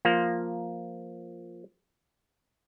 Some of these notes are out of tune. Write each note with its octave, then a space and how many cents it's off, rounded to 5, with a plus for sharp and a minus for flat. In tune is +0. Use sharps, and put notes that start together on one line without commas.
F3 +0 A#3 +0 F4 +0